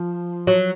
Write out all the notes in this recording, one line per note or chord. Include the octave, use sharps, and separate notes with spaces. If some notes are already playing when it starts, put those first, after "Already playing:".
Already playing: F3
F#3